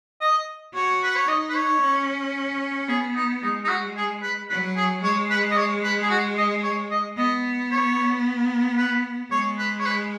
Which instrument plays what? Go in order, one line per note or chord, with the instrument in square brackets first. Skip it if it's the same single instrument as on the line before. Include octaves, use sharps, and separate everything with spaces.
[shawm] D#5
[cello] F#4 [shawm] C#5
[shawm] B4
C#5
[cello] D#4 [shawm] D#5
[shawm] B4
C#5
[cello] C#4
[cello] B3 [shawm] G#4
[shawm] D#4
[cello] G#3 [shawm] D#4
[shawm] D#4
F#4
G#4
B4
[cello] F#3 [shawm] B4
[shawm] G#4
[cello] G#3 [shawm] C#5
[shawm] B4
D#5
C#5
B4
G#4
F#4
D#5
C#5
D#5
[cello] B3 [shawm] D#5
[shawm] C#5
B4
[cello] G#3 [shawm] C#5
[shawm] B4
C#5
B4